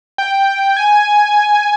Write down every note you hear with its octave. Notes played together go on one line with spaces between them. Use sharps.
G5
G#5